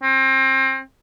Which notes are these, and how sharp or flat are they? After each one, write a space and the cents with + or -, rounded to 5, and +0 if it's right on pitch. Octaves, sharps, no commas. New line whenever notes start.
C4 +30